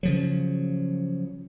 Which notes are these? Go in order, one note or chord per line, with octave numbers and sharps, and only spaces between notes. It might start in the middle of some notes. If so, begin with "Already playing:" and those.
C#3 F3 F#3